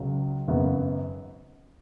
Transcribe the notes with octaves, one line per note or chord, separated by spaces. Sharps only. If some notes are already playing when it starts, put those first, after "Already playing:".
Already playing: C#2 C#3 F#3
G#1 F#2 C#3 B3